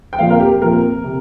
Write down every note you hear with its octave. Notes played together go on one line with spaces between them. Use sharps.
G5
A#2 F3 C4 F5
A#4
G4
A#2 F3 C4 A#4
C3